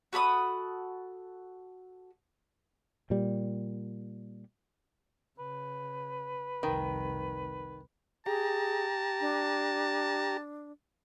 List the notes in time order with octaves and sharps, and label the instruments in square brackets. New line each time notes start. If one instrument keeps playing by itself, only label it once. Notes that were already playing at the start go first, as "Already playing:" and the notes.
[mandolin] F#4 A4 B5 D#6
[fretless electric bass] A#2 G3
[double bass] C#3 [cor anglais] B4
[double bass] F1 C2 [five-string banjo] D#3
[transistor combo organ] G4 A#5 [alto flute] G#4 [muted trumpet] A5
[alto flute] D4